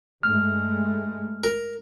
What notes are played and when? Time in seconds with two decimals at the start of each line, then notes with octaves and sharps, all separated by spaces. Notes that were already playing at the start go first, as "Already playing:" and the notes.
0.23 G2 G#3 A3 F6
1.44 A#4